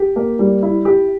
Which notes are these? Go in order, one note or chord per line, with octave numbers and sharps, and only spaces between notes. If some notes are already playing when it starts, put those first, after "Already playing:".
Already playing: G4
A#3
G3
E4
G4